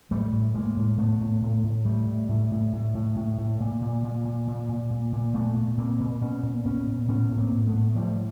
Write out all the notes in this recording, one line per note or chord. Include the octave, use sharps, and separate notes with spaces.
A2 G3 A3
A2
A2 G#3 A#3
A2
A2 A3 B3
A2
A2
A2
A2 G3 A3
A2
A2
A2
A2
A2
A2
A2
A#2
A#2
A#2
A#2
A#2
A#2
A#2
A#2
A#2 A3 B3
A#2
A#2 A#3 C4
A#2
A#2 B3 C#4
A#2
A#2 B3 C#4
A#2
A2 B3 C#4
A2
A#3 C4
A2
A3 B3
A2
A2 F3 G3